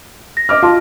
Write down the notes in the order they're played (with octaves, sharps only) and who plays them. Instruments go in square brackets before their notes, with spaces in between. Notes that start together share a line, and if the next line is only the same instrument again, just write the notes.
[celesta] A#6
[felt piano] D#5 D6 F6
[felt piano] F4 [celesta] F5 A5 C6